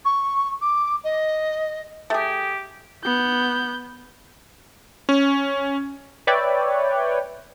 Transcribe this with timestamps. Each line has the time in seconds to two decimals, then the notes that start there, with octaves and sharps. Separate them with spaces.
0.04 C#6
0.61 D6
1.03 D#5
2.10 A3 G4 G#4
3.04 B3 G6
5.09 C#4
6.27 B4 C#5 D5 E5 G5